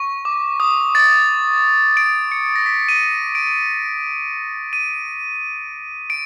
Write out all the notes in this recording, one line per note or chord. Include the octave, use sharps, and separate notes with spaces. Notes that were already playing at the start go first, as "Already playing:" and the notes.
Already playing: C#6
D6
D#6
A6
D7
C#7
A#6
B6
D#7
D7
D#7
D7